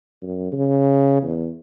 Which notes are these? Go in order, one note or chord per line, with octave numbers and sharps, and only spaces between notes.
F#2
C#3
E2